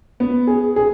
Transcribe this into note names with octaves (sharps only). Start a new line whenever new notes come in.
B3
G#4
G#4